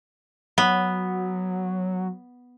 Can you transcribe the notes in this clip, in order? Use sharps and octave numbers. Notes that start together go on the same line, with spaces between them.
F#3 B3